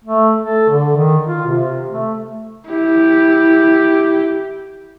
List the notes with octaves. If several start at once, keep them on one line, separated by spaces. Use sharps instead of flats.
A3
A4
D3
D#3
F4
C3
A3
E4 G4